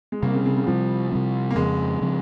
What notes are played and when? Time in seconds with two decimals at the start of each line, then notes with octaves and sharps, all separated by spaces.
0.12 G#3
0.22 C3 G3 A#3 C4
0.34 C#3
0.45 C#3
0.57 C#3
0.67 C3 F3 G3 C4
1.11 C3 G3 C4
1.51 A#3
1.55 F2 C#3 F3 G#3 C4
2.01 C#3 F3 C4